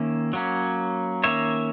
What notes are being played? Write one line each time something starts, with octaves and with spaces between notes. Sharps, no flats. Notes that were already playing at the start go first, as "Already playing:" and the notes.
Already playing: D#3 A#3 C#4 E5
F#3 A#3 C#4
D#3 A#3 C#4 C#5 E5